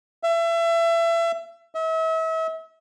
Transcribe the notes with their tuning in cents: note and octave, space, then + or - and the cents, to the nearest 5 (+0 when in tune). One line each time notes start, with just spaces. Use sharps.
E5 +30
E5 -40